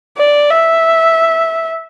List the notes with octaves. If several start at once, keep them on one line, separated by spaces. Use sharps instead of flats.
D5
E5